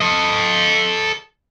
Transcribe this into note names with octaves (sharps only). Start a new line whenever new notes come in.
A4 D#5